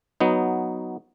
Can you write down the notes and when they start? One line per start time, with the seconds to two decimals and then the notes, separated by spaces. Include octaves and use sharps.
0.20 F#3 B3 D#4